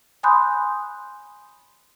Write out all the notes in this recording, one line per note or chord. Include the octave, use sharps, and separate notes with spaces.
G#5 B5 C6 D#6 F#6 G6